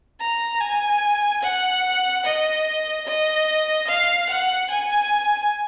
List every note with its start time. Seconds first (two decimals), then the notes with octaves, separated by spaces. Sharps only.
0.20 A#5
0.61 G#5
1.43 F#5
2.25 D#5
3.07 D#5
3.88 F5
4.29 F#5
4.70 G#5